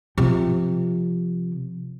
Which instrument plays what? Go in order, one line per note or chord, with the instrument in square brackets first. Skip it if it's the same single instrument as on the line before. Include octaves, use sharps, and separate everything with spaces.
[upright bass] C3 F3